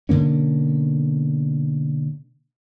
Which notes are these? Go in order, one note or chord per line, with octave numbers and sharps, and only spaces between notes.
B2 D3 A#3 C#4